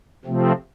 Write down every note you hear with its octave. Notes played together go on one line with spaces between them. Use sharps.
C3 F3 A3 C4